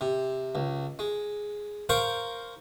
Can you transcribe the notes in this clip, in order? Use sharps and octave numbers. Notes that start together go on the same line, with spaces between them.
C3
C#2
G#3
A#4 C5 F5 G5 A#5 C#6